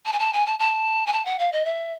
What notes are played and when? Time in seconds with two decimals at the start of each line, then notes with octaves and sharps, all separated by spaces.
0.05 A5
0.12 G#5
0.19 A5
0.33 G#5
0.46 A5
0.59 A5
1.06 G#5
1.12 A5
1.25 F#5
1.39 F5
1.52 D#5
1.65 E5